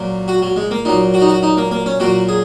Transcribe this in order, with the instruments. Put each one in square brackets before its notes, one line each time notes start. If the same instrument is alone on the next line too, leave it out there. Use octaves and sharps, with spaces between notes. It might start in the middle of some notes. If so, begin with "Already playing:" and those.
Already playing: [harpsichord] A#2 F#3
F#4
F#3
G#3
A#3
A#2 F#3 D#4
F#4
D#4
F#4
D#4
A#3
A#3
C#4
A#2 F#3 F#4
G#4